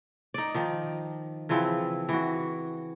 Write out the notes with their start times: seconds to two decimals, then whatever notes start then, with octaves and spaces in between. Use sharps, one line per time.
0.34 D#4 D5
0.55 D#3 F3
1.49 C#3 E3 F3 C4
2.09 E3 F#4